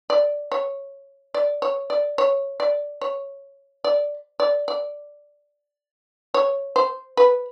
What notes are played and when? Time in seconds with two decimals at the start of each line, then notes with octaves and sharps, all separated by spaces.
0.10 D5
0.52 C#5
1.34 D5
1.62 C#5
1.90 D5
2.18 C#5
2.60 D5
3.01 C#5
3.84 D5
4.40 D5
4.68 D5
6.34 C#5
6.76 C5
7.17 B4